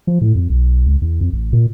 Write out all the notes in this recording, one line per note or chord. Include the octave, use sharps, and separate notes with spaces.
F3
A2
F2
B1
C#2
E2
F2
A1
A#2